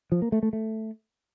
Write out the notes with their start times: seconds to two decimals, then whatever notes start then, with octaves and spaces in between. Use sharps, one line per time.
0.12 F3
0.22 A#3
0.32 A3
0.43 A3
0.53 A3